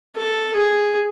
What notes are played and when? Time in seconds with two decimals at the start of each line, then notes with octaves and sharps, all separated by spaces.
0.16 A4
0.55 G#4